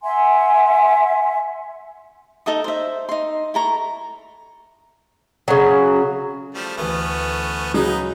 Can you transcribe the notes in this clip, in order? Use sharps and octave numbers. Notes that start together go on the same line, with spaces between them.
E5 F#5 G#5 C6
D#4 A4 E5 D#6
C5 E5
D#4 C6
E4 A4 A#5 C#6
C#3 F#3
F3 G3 A3
D2 E3 A3 B3 C#4
C#3 F#3 D#4 B4 D#5